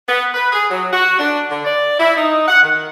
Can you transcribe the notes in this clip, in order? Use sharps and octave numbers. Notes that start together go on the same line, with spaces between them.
B3
B4
G#4
F#3
F#4
D4
D3
D5
E4
D#4
F#5
D#3